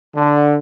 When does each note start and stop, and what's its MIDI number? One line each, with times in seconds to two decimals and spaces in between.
0.16 0.57 50